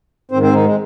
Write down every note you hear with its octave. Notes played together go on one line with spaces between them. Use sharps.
G#2 D#3 C4 C5
C4 C5
D#3 D#4
G#3